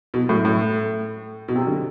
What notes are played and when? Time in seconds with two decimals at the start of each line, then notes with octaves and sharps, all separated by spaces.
0.14 B2
0.29 A2
0.45 A2
1.48 B2
1.55 C3
1.67 D3